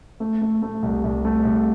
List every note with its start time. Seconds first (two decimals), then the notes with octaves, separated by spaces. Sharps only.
0.20 A3
0.42 A3
0.62 A3
0.82 C2
1.04 C2
1.25 A3
1.45 C2